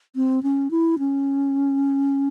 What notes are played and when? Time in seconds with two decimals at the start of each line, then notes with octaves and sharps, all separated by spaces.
0.16 C4
0.43 C#4
0.71 E4
0.99 C#4